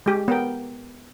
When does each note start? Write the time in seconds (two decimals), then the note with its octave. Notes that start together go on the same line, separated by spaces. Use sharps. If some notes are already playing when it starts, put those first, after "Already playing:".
0.06 G#3 G4
0.28 B3 A#4 G5